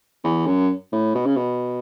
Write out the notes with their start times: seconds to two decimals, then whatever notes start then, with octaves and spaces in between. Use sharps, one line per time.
0.24 E2
0.46 F#2
0.93 A2
1.15 B2
1.26 C#3
1.36 B2